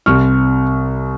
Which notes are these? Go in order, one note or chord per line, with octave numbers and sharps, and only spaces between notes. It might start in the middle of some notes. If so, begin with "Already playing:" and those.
C2 C3 G3 C#6 F6